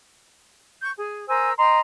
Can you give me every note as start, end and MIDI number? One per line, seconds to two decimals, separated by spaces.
0.82 0.91 85
0.82 0.91 91
0.96 1.27 68
1.29 1.52 70
1.29 1.52 72
1.29 1.52 80
1.29 1.52 88
1.58 1.78 75
1.58 1.78 79
1.58 1.78 82
1.58 1.78 84